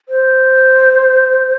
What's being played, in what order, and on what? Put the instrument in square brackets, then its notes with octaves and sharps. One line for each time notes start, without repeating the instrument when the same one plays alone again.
[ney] C5